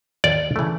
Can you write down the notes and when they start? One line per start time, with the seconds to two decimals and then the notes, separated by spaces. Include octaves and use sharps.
0.24 D#2 D5
0.56 C#3 E3 A3